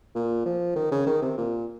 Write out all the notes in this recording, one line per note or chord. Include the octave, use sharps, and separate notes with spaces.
A#2
F3
D#3
C#3
D#3
C3
A#2